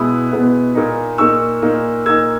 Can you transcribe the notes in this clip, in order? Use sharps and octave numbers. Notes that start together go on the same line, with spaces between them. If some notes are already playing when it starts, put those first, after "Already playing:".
Already playing: B2 G#3 B3 E4 B5 D#6
B2 G#3 B3 E4
A#2 A#3 D#4
A#2 A#3 D#4 C#6 E6
A#2 A#3 D#4
A#2 A#3 D#4 E6 G#6